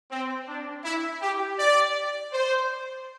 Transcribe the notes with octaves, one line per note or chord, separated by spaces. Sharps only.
C4
D4
E4
G4
D5
C5